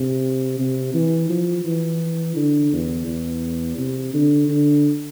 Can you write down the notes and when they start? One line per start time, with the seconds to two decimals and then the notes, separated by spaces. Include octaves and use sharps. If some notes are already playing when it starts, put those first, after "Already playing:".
Already playing: C3
0.59 C3
0.94 E3
1.29 F3
1.65 E3
2.36 D3
2.72 E2
3.07 E2
3.78 C3
4.14 D3
4.49 D3